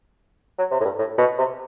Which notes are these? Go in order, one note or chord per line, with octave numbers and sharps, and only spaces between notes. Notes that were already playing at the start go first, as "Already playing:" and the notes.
F#3
C3
A2
G2
A2
B2
C3